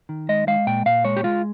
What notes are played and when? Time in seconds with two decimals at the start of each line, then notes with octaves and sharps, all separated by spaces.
0.09 D#3
0.29 G#3 D#5
0.47 G#3 F5
0.67 A#2 G5
0.86 A#2 F5
1.05 G#3 C#5
1.17 G4
1.24 G#3 F4